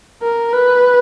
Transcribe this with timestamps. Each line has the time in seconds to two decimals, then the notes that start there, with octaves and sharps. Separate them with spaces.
0.22 A#4
0.53 B4